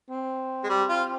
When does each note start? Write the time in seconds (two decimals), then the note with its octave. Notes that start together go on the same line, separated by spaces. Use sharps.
0.10 C4
0.64 G#3
0.69 G3
0.89 F4